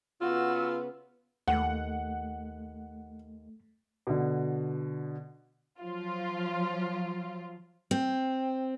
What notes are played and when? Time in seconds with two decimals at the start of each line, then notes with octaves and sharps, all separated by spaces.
0.21 C#3 B3 F4 F#4 E6
1.48 D#2 A3 F#5
4.07 B2 D3
5.80 F3 F#3 F4
7.91 C4